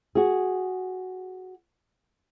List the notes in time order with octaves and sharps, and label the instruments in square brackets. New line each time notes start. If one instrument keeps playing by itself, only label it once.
[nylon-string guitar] F#4 G#4